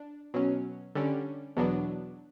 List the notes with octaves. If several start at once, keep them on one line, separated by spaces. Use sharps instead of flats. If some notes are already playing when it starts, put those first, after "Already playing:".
Already playing: D4
B2 F#3 C#4
D3 G3 C#4
E2 B2 F#3 B3 D4